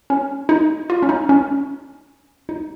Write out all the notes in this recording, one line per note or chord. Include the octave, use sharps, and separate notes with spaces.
C#4
D#4
F4
C#4
D#4
C#4
D#4